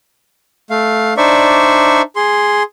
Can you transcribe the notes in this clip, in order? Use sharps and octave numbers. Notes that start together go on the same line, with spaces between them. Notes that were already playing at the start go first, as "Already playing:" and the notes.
A3 F5
D4 D#4 C5 D5 E5 C#6
G#4 C6